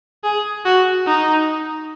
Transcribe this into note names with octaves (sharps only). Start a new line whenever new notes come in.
G#4
F#4
D#4